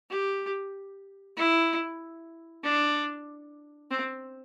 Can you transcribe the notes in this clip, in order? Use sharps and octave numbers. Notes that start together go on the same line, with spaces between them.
G4
E4
D4
C4